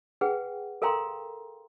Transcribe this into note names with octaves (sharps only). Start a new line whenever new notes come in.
G#4 B4 F#5 G5
A4 A#4 F5 G5 A#5 C6